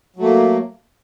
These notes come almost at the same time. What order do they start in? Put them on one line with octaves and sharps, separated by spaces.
F#3 A3 A#3